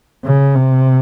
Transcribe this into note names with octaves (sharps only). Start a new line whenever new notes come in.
C#3
C3